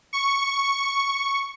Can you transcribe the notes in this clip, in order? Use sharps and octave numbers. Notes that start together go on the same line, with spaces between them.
C#6